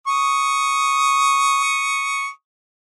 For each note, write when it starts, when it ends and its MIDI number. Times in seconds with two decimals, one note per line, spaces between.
0.07 2.30 85
0.07 2.30 87